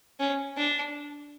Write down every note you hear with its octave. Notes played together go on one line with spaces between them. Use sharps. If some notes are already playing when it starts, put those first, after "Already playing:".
C#4
D4